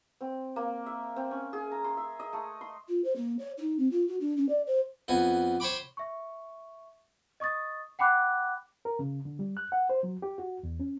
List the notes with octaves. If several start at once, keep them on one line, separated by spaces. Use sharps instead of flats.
C4
A#3
E5
C4
C#4
G#4
A#5
C6
E5
D#5
A3
C6
F4
C5
A#3
C#5
D#4
C4
F4
F#4
D4
C#4
D5
C5
F2 B3 G#5
C5 C#5 G5 B5 D6
E5 C#6
D#5 C#6 D#6 A6
F#5 G5 B5 D6 F#6
A#4
C#3
D3
G3
F#6
F#5
C5
F#3
G4
F#4
E2
C#4